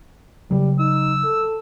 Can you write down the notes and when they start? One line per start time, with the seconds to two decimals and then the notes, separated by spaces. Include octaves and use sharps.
0.51 C#3 F#3 G3
0.79 D#4 E6
1.24 A4